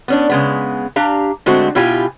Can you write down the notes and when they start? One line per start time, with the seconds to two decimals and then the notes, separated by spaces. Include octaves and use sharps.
0.08 B3 C#4 D4
0.29 C#3 G#3 B3
0.96 D4 G4 F5 A#5
1.46 D3 G#3 A3 C4 F#4 C5
1.75 B2 E4 F4 G4 G#5